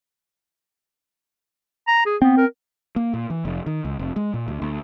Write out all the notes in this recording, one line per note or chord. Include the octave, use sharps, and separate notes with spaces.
A#5
G#4
B3 C4
A#4
A#3
A#2
E3
F1
D#3
C#2
F1
G#3
A#2
D2
D2